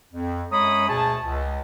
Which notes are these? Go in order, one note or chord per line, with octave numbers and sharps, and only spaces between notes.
F2
F#2 G#3 C#5 A#5 B5 D#6
D2 B2 G#4 C#5 A5
C#2